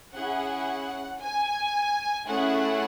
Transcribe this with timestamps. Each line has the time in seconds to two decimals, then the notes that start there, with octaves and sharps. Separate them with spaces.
0.14 C#4 E4 G#4 F#5
1.21 G#5
2.27 A3 C#4 E4 G#4 F#5